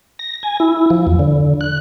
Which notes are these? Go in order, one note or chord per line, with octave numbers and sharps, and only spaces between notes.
A#6
G#5
E4
F3
E2
D3
F#6